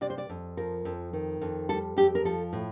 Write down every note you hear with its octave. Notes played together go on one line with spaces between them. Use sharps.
C3 D5
C5
D5
F2
F3 A#4
F2
D#3
F2
G3 A4
F2 G4
A#4
F3 A4
A2